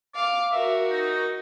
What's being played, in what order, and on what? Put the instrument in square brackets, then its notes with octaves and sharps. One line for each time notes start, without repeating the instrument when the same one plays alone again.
[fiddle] F5 [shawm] D6
[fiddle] F#4 A#4 [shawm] E5
[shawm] D#4